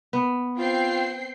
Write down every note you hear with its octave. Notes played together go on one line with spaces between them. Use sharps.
B3
C4 F4 G5 C7